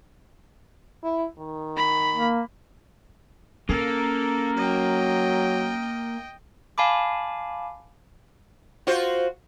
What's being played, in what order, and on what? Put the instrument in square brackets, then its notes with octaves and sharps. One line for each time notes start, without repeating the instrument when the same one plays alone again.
[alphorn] E4
D#3
[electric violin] B5
[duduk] A#3
[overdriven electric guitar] A#3 [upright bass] C#4 [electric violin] A4
[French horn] F#3 [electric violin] D#5 G5
[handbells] F5 G#5 A5 B5 D6
[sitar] F4 F#4 C5